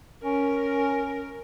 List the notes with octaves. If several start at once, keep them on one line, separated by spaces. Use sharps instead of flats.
C#4 A#4